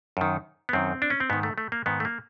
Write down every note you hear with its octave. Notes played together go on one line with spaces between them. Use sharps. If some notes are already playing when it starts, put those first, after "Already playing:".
F#2 D#3
B3
F#2 D#3 C4
D4
C#4
C4
G#2 D#3 B3
A3
A3
A#3
G#2 D#3 B3
A3
A#3